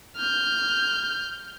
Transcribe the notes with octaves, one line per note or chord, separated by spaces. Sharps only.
F6 G6